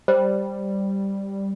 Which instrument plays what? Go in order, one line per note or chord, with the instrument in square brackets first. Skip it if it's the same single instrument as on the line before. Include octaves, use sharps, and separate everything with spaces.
[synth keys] G3 [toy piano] C5